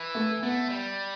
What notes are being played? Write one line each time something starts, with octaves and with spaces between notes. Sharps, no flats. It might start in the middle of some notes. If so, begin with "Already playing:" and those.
Already playing: E3
A3
A3 B3
G3